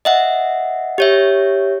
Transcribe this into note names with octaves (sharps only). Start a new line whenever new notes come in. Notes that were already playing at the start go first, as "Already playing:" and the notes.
D#5 E5 F#5
G4 C#5 E5